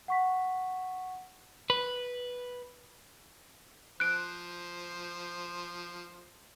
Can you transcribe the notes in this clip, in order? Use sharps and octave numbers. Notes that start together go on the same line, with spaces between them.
F#5 C#6 B6
B4
F3 C5 F#6 D7